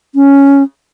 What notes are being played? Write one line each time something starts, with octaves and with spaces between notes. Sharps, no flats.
C#4